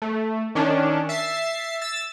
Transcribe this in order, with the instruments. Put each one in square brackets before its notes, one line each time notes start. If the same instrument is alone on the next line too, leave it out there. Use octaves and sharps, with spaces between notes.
[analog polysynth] A3
D#3 C#4 D4
E5 A6 C7
E6 A6